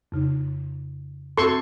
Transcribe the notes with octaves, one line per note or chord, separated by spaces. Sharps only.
F2 C#3 D#4
F#2 C4 F#4 A4 C6 C#6